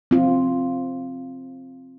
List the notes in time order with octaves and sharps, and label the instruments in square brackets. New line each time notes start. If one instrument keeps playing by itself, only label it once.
[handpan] C4 F4